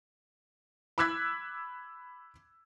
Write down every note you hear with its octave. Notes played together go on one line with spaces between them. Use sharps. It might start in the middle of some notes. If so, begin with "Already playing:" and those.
B5 D6 E6 F#6 G#6 B6